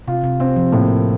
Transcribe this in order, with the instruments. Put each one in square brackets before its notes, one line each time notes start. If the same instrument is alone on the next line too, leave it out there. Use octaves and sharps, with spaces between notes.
[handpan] C3 [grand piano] F4
[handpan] C3
[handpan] C3 [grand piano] C4
[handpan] F3
[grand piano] A2 [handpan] A#3